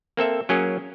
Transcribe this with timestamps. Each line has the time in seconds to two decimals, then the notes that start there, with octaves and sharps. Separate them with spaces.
0.17 A#3 C4 A4 E5
0.49 F#3 A#3 C#4 G#4